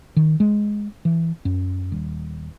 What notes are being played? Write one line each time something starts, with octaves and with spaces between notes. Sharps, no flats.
D#3
G#3
E3
F#2
D#1